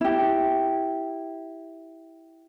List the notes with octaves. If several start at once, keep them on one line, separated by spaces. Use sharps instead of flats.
E4 G4